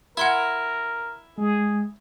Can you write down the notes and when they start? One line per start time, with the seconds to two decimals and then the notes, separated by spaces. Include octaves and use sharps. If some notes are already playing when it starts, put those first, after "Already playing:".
0.17 E4 A#4 F#5 C6 G#6
1.38 G#3 G#4